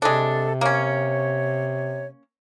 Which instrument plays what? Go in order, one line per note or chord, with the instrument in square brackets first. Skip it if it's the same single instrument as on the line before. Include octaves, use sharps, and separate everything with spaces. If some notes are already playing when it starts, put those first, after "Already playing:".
[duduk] C3 [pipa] G#3 D4 [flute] A4
[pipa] A#3 C#4 [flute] C#5